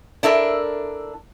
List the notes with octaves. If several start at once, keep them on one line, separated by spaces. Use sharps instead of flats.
D4 E4 A4 A#4